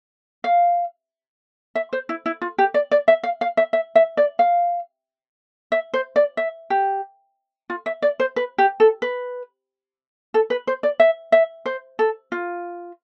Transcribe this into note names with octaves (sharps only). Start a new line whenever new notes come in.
F5
E5
C5
E4
E4
F4
G4
D5
D5
E5
F5
F5
E5
E5
E5
D5
F5
E5
C5
D5
E5
G4
F4
E5
D5
C5
B4
G4
A4
B4
A4
B4
C5
D5
E5
E5
C5
A4
F4